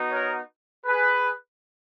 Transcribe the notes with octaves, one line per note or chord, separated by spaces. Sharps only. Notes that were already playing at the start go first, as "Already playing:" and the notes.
Already playing: B3 D#4 F#4
A#4 C#5
G#4 B4